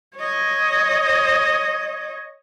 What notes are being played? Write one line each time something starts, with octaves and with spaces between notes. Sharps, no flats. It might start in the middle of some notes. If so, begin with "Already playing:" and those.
C#5 D#5